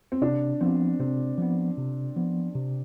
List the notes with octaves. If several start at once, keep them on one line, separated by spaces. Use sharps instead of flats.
C4
C3 D4
F3 B3 C4
C3 C4
F3 B3
C3
F3 B3
C3